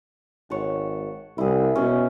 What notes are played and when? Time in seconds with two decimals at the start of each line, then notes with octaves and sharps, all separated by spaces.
0.50 G#1 C#5 F#5 A5
1.38 C2 E4 G#4
1.76 B2 C#4